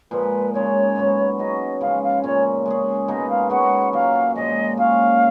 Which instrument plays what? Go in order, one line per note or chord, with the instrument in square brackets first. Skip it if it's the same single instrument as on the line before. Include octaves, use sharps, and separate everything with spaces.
[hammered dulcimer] A#2 F3 G#3 [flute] B4
[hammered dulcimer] C#3 G#3 D#4 [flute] C#5
[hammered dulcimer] G#2 F#3 B3 F#4
[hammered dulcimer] F#3 C#4 G#4 [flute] D#5
[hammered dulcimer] C#3 F3 G#3 [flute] F5
[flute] F5
[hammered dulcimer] A#2 G#3 C#4 [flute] C#5
[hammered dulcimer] G#3 C#4 G#4
[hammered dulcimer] B2 G#3 D#4 A#4 [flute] D#5
[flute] F5
[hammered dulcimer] G#3 C#4 F#4 B4 [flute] F#5
[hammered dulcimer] A#2 F#3 A#3 [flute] F5
[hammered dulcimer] A#2 F3 G#3 [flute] D#5
[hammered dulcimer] A#2 G#3 C#4 F#4 [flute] F5